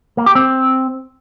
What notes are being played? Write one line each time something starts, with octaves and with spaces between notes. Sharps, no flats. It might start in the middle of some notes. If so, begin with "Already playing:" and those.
A#3
G4
C4